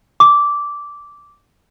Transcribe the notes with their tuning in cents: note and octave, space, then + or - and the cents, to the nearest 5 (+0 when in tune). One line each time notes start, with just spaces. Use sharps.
D6 -10